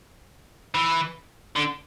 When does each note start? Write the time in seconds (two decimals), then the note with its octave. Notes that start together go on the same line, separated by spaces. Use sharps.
0.75 E3
1.56 D3